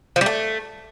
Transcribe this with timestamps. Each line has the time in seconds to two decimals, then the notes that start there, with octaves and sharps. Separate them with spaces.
0.16 F3
0.21 G3
0.26 A3